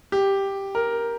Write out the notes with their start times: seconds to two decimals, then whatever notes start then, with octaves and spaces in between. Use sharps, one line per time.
0.12 G4
0.75 A#4